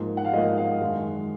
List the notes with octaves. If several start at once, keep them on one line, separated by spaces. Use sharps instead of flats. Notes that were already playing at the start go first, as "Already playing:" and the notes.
Already playing: G#2 F3 A#3
F#5
F5
G#2 F3 A#3 D#5
F5
F#2 D#3 G#3